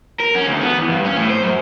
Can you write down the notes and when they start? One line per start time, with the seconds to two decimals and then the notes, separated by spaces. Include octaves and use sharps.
0.20 A#4
0.35 C#4
0.47 D2
0.61 B3
0.77 E2
0.89 G2
1.05 C#4
1.16 A2
1.30 C5
1.43 F#2